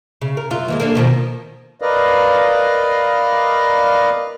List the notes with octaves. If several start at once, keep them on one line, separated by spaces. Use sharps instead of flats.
C#3
A#4
F#2 F#3 F4
D#2 E3 G#3
A#3 D4 A4
B2 D#3 F3
A#4 B4 D5 D#5 F5